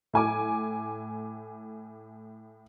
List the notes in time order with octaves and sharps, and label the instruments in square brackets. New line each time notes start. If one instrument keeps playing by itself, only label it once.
[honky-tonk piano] A2 G#5 D6